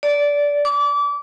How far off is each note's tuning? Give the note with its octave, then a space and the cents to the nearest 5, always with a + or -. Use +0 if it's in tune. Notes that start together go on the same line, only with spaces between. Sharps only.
D5 -15
D6 -30